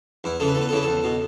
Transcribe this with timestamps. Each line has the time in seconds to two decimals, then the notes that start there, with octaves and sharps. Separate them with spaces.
0.24 E2 E4
0.40 C#3 E3 A4
0.48 B4
0.55 E2 A4
0.61 B4
0.69 A4
0.72 C#3 E3 B4
0.83 E2 A4
1.04 B2